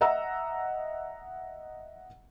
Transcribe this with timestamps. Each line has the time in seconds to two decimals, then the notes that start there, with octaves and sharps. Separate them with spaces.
0.01 D#5 E5 F#5 A#5 E6